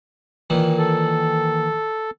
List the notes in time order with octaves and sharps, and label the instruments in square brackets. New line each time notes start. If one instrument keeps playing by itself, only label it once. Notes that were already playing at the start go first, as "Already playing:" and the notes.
[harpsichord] A#2 D#3 E3
[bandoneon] A4